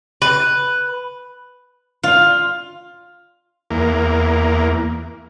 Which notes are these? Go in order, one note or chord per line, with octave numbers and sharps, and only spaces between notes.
B4
F4
E2 A#3